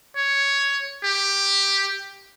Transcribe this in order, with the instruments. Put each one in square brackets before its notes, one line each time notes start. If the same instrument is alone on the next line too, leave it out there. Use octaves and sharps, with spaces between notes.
[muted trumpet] C#5
G4